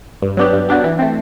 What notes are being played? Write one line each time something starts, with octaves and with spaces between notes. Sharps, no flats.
G2
F#3 B3 D4 G4
G2
F#3 B3 D4 G4
E3
A3 C4